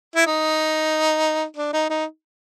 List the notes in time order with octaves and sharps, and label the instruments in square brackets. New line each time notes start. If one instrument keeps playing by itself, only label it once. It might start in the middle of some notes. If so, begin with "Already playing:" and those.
[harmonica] E4
D#4
D4
D#4
D#4